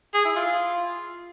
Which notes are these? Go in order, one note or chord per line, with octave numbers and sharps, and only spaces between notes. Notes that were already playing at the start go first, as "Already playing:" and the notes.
G#4
E4
F4